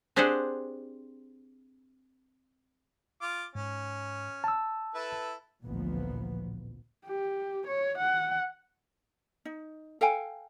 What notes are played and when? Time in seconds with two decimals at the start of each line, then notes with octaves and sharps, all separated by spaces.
0.16 C4 D4 G4 G#4 C5 F#5
3.22 F4 D6
3.55 G#2 C#4
4.44 A5 E6
4.95 E4 A4 B4
5.64 A1 D2 A#2 F3 B3
7.06 G4
7.67 C#5
7.98 F#5
9.45 D#4
10.01 A4 F5 G5 G#5